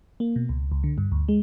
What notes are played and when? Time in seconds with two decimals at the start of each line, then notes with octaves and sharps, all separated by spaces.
0.20 A#3
0.36 B2
0.49 C#2
0.72 C#2
0.84 D3
0.98 G2
1.12 D2
1.29 G#3